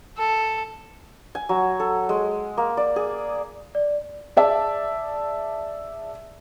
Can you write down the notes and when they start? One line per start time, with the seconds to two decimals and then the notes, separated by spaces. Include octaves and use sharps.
0.18 A4
1.35 G#5
1.49 F#3
1.80 A4
2.09 G#3
2.57 A#3
2.77 D5
2.96 G#4
3.75 D5
4.37 G#4 D5 E5 A5